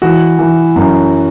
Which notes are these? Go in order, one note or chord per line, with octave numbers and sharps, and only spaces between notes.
E3 F#4
E3
F#2